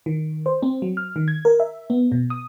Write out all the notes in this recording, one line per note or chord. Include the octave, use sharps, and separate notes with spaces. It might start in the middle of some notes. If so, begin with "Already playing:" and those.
D#3
C5
C4
F#3
F6
D#3
G#6
A#4
E5
B3
B2
D#6